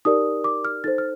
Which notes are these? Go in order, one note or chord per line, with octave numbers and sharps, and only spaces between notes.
D#4 G4 A#4 D5 D#6
D6
F6
D#4 A4 C5 A6
F6